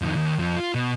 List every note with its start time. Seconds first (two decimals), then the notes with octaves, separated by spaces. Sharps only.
0.02 F2 D#3
0.16 D#2
0.39 F2 F3
0.57 F4
0.75 B2